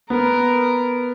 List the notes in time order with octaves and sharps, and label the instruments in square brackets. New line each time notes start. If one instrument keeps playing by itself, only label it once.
[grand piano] B3 [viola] A#4